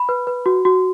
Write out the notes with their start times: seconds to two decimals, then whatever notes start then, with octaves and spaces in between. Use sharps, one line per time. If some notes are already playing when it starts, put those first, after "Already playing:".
Already playing: B5
0.09 B4
0.27 B4
0.46 F#4
0.65 F#4